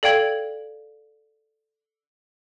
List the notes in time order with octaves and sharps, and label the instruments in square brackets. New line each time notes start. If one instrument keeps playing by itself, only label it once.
[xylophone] A4 D5 F5 G5 G#6 F#7